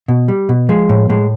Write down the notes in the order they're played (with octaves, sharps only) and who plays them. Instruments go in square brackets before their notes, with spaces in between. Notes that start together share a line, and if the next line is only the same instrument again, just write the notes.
[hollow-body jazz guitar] B2
G3
B2
F3 G#3
A2
A2 G#3